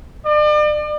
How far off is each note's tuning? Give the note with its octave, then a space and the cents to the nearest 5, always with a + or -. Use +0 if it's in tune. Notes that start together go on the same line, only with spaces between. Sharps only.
D5 +40